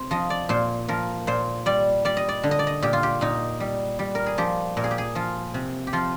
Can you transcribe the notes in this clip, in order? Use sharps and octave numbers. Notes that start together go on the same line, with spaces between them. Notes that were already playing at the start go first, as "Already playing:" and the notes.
Already playing: C3 C5
F3 D#5
D5
A#2 C5
F3 A#4
A#2 C5
G3 D5
G3 D5
D#5
D5
D3
D#5
D5
D#5
A#2 G4
F4
G4
A#2 D#4
G3
G3
A#4
G#4
F3 G4
A#2 A#4
G#4
G4
G#4
F3 F4
C3
G4
F3 F4